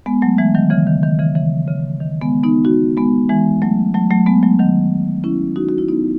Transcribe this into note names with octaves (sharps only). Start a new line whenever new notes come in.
G#3 B3
F#3 A3
E3 G#3
D#3 F#3
C#3 E3
D#3
D#3
C#3 E3
C#3 E3
C#3
D#3
G#3 B3
B3 D#4
D#4 F#4
G#3 B3
E3 G#3
F#3 A3
F#3 A3
F#3 A3
G#3 B3
F#3 A3
D#3 F#3
C#4 E4
D#4 F#4
F#4
E4
B3 D#4